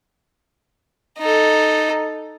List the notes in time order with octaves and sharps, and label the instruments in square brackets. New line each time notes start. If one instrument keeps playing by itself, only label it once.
[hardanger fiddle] D#4 A4